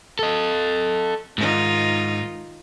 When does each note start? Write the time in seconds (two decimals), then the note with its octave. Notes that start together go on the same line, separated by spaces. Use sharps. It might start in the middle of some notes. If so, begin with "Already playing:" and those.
0.19 A4 D#5
1.38 G#2 D#3 D#4 F4